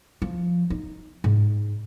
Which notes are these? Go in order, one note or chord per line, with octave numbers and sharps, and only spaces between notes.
F3
D#4
G#2